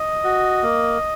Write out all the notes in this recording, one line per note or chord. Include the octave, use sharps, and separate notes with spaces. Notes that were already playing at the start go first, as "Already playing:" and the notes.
Already playing: D#5
F#4
A#3